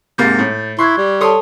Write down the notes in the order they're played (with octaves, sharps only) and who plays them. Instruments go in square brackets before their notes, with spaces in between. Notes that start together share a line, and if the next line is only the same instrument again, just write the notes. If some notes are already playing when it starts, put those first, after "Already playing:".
[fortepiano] G#2 C3 A#3 [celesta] G6 A6
[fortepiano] A2
[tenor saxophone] E4 [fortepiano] C6 [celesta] C#6 F#6 G#6
[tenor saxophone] G3
[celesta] A4 A5 [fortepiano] C#5 C6 D#6